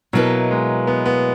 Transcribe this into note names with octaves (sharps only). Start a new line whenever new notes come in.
B2 F#3 A#3 E4 B4 D#5
G#3
B3
B3